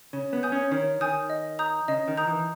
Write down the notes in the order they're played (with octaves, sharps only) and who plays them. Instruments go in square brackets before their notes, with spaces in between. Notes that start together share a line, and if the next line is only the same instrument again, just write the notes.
[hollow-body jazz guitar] C#3 [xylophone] C#5
[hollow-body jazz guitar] B3
[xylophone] G#5 D#6 G6
[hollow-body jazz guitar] C#4
[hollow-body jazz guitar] D#3 [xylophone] C#5
[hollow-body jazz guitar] D#3 [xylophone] G#5 D#6 G6
[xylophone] D#5
A#5 D#6 G6
[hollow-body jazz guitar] C#3 [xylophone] D#5
[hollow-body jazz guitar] D#3
[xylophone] A#5 D#6 G6
[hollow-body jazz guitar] E3